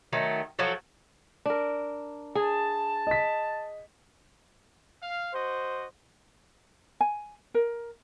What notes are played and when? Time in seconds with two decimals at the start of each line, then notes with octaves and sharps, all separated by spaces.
0.13 D#3 F#3 A3
0.59 F3 F#3 F#4 A4
1.46 D4 A#4
2.35 G#4 A5
3.07 D#5 B6
5.01 F5
5.34 F#4 C5 D#5
7.01 G#5
7.54 A#4